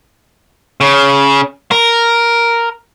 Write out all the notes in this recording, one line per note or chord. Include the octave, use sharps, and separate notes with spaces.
C#3
A#4